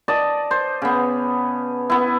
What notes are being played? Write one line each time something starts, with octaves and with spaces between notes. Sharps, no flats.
D5 D#5 A5
C5
C#3 B3
B3 E4